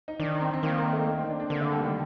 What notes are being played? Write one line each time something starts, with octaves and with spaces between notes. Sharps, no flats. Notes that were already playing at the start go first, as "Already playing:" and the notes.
D#4
D#3 D4
C4
C4
D#3 A#3
A#3
A3
A#3
C4
D4
D4
D3 A#3
A3
G3
D#3